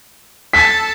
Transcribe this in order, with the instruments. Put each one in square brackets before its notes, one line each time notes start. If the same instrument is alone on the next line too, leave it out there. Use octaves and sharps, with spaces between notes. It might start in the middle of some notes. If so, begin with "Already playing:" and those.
[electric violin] A4 A5 [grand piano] B6